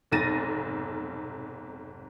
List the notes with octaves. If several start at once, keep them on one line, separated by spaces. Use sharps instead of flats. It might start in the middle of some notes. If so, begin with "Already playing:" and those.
F1 B1 G#2 A6 A#6 D#7